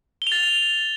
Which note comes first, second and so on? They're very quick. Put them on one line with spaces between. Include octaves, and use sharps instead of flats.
G7 F7 A6